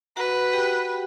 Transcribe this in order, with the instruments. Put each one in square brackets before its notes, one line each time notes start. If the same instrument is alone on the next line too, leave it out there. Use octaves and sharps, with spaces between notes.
[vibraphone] F#4 F#5 [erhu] B4
[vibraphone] G4 G5